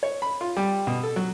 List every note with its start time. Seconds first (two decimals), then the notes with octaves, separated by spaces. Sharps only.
0.03 C#5
0.22 B5
0.41 F4
0.57 G3
0.87 B2
1.03 A4
1.16 F#3